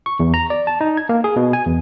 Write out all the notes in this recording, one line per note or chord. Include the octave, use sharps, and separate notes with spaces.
C#6
E2
A#5
D5
A5
D#4
G#6
A#3
G#4
B2
G#5
E2